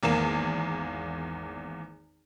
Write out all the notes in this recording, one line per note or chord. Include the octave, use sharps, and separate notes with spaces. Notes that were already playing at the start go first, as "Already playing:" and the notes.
G#1 E2 A#3 E7